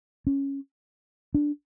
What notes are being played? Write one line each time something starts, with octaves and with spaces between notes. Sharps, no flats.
C#4
D4